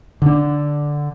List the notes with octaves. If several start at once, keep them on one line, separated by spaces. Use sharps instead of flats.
D3 D4